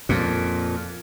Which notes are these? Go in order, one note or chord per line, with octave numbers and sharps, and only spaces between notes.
F2 A#2